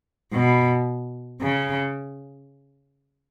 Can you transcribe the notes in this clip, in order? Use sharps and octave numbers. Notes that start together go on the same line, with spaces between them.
B2
C#3